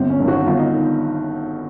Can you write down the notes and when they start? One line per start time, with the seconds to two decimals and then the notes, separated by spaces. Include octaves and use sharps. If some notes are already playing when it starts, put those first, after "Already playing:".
Already playing: G1 C4
0.10 C#4
0.19 G2 D#3
0.28 F#4
0.45 G1 F4
0.59 D#4
0.72 D#3